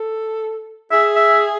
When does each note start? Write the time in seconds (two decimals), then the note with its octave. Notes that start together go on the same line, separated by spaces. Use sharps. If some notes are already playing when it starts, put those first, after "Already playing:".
Already playing: A4
0.91 G#4 E5
1.15 E5